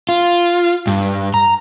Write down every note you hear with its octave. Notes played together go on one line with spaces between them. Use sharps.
F4
G2
A#5